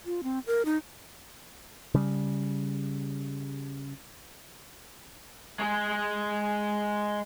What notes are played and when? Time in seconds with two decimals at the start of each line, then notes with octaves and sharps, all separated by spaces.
0.06 F4
0.23 C4
0.46 A#4
0.65 D#4
1.95 C#3 G3
5.59 G#3 G#4